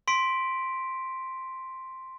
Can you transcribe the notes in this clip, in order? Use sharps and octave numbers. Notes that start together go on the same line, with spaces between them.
C6 B6 D7